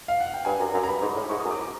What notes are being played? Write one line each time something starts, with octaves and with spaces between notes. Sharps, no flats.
F5
F#5
G5
G2 G#5
F#2
F#2
A#5
G2 B5
G#2
A2
G#2 C#6
D#6
F#2
D6
A#5